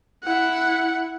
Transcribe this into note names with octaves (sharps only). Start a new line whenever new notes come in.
E4 F#5